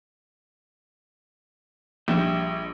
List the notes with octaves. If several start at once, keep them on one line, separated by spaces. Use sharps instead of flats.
A#1 G3 D#5 E5 G5